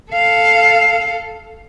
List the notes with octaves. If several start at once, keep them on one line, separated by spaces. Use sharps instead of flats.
A4 F5